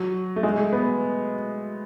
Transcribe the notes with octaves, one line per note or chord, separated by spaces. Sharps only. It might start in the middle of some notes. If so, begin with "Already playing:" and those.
Already playing: F#3
A3
G#3
A3
B3